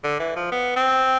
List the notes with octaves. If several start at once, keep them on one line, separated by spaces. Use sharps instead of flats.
D3
E3
F3
B3
C4